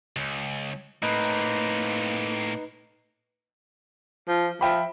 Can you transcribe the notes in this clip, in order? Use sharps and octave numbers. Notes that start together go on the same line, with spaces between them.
C#2
A2 A#3 C4 D#4 B4
F3
F3 E5 G5 B5